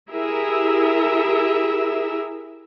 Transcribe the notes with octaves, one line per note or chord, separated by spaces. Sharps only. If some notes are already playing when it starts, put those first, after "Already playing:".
E4 G4 G#4 A#4 E5